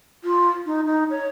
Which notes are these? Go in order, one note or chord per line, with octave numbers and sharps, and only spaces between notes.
F4
D#4
D#4
C#5